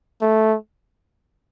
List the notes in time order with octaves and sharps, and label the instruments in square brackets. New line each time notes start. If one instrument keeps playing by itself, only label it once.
[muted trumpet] A3